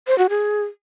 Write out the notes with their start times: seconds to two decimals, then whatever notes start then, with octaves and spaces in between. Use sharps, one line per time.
0.07 C5
0.18 F#4
0.30 G#4